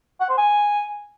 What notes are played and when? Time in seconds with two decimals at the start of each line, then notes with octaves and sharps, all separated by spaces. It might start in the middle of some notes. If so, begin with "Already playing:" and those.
0.20 F#5
0.29 C5
0.37 G#5